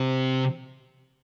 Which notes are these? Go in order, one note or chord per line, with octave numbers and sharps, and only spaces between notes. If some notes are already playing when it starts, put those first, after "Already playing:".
Already playing: C3